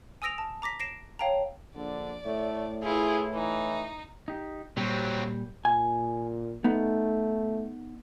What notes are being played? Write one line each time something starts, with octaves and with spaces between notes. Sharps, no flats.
G#5 D#6 E6 A#6 D7 F7
A5
A#5 D6 A#6 B6
A#6 C7 D7 E7
C#5 F5 G5 A5 A#5
A#1 D3 D5
A2 A3
E4 F4 G#4 B4
E3 D#4
D#4 G4
A#2 F#3 G3 C4 G4
A#2 G#5
A3 B3 D#4